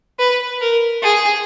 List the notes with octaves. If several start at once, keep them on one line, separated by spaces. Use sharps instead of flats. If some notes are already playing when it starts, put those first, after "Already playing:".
B4
A#4
G#4